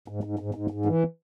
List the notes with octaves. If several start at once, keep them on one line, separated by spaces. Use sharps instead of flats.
G#2
G#2
G#2
G#2
G#2
E3